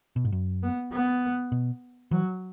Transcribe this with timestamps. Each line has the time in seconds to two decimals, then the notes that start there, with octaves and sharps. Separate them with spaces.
0.16 B2
0.25 G#2
0.32 F#2
0.63 B3
0.92 B3
1.52 B2
2.11 E3 F#3